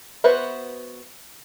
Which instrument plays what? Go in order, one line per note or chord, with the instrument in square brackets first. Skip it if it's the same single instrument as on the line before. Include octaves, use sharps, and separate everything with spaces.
[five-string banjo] B3 F#4 B4 C5 E5